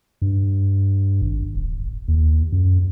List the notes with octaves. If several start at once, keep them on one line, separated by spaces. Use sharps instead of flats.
G2
G#1
D1
D#2
F#2